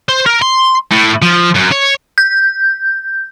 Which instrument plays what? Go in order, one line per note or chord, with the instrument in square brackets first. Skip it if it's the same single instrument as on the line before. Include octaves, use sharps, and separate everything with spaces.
[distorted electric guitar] C5
A#4
C6
A2
F3
F#2
C#5
[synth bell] G6